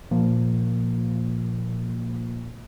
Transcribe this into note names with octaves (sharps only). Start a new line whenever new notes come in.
A#2 F3 A#3